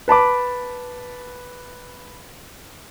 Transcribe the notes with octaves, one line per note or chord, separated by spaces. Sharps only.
B4 A5 B5 D6